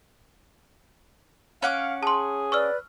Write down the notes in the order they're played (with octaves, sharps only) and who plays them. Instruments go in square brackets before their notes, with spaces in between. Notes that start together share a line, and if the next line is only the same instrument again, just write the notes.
[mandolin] C#4 F#5 D6 [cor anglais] F5
[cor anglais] G#4 [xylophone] A5 C6
[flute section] B4 D5 [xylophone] C#6 E6 F6